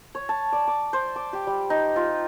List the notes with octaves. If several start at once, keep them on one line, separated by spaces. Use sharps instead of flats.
C#5
A5
D5
D6
C5
D6
G4
G3
D#4
F4